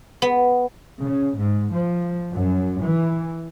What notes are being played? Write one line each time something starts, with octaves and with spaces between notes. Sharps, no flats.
B3
C#3
G#2
F3
F#2
E3